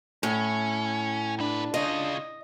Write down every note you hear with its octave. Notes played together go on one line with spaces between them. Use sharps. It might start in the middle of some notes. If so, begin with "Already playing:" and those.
A2 C#4
A#3 D4 B4
C#3 F4 D#5